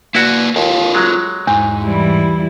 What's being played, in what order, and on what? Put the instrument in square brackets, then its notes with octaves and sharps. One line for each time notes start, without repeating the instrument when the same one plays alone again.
[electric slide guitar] A#3 B4 D5 [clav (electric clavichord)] E4 F#4
[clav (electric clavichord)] D#2 [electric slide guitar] F4 A4 A#4
[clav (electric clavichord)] F#3 G#3
[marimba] E2 [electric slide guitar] G#2
[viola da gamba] E3 G3 E4